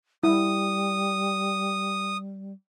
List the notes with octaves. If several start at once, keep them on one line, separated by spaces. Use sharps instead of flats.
G3 E4 D#6